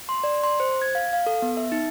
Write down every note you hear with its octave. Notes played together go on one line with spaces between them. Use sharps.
C6
D5
C6
C5
G#6
F5
F5
A4
B3
E5
D#4